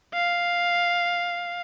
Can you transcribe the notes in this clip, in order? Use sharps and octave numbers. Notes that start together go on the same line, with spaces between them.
F5